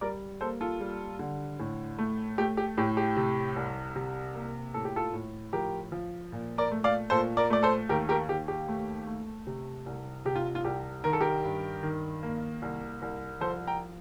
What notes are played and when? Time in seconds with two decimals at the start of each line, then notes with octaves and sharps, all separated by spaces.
0.01 G3 A#4 D5
0.41 A#3 A4 C5
0.61 F4 A4
0.80 G3
1.19 D3
1.59 A2
1.98 A3
2.38 A3 G4
2.57 G4
2.77 A2 G4
2.97 G4
3.17 C3
3.56 C2
3.96 C3
4.35 A#3
4.74 A2 A4
4.85 G4
4.96 F4 A4
5.13 A2
5.53 F3 G4 A#4
5.92 F3
6.32 A#2
6.58 A#4 D5
6.71 A3
6.84 D5 F5
7.10 A#2 A4 C5
7.37 A#4 D5
7.50 A3 D5
7.63 A4 C5
7.89 D#2 G4 A#4
8.09 G4 A#4
8.29 D#2 G4
8.48 G4
8.68 A3
9.07 A3
9.47 C3
9.86 C2
10.25 C3 G4
10.35 F4
10.55 F4
10.65 C2 G4
11.04 D#3 A#4
11.13 A4
11.21 G4 A#4
11.44 G2
11.83 D#3
12.23 A#3
12.62 C2
13.02 C2
13.41 F3 A4 C5
13.67 G5 A#5